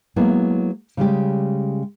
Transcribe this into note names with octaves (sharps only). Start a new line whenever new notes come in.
F#3 G#3 A#3 B3 E4
C#3 G3 G#3 G4